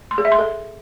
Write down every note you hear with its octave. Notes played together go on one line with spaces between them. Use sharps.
C6
G#4
E5
C6
A4